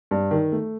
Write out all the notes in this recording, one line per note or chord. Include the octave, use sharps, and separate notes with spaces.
G2
D#3
A3